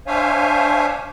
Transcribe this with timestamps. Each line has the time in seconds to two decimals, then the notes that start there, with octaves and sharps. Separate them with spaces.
0.07 D4 C5 C#5 E5 F5 G#5